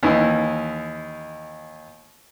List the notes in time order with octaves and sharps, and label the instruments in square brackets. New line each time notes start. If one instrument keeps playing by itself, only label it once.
[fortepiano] D#2 E3 D#5